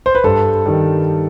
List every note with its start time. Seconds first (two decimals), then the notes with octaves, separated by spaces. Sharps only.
0.06 C5
0.15 B4
0.24 G2 A4
0.66 D#3 G3